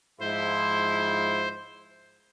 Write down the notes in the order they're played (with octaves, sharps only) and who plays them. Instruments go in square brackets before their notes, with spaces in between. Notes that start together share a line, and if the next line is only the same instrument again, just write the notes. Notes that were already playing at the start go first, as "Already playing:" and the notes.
[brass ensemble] G#2 F3 E4 [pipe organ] C5